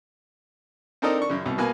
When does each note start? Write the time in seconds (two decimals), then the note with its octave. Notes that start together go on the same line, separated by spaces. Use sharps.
1.02 C4 D4 D#4 A4 A#4 D#5
1.18 D4 C#6
1.29 F#2 C#3
1.46 C2 B2
1.58 B2 A#3 B4 G#5